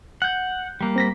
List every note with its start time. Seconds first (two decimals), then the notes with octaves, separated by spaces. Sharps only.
0.22 F#5 F#6 G6
0.81 G3 A#3
0.96 C4 A#6 B6